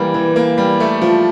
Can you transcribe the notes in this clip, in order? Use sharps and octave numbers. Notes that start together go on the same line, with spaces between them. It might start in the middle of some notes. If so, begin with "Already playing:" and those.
Already playing: E3 G3 A#3
E3
A#3
G3
A3
F3